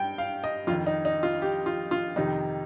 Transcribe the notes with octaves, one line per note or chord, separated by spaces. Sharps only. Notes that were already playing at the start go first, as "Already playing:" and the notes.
Already playing: G2 G5
F5
D#5
F2 D#3 F4
D#4
D#4
F4
G4
F4
F4
F2 C3 D#3 D#4